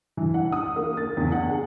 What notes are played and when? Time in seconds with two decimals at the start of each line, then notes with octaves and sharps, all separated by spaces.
0.17 E3
0.34 F#5
0.52 D#6
0.76 A#3
0.97 A6
1.17 E2
1.32 F#5
1.51 G#4